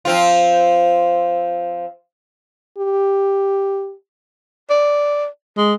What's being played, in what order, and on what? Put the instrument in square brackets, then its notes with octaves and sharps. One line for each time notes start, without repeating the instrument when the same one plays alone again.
[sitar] F3 C4 F4
[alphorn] G4
[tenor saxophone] D5
G#3